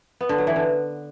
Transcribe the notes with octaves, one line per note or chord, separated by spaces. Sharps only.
B3
D3
F#3
E3
D3